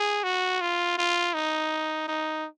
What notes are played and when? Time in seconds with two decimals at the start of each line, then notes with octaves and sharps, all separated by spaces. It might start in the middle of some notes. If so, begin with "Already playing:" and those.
Already playing: G#4
0.24 F#4
0.61 F4
0.98 F4
1.34 D#4
2.08 D#4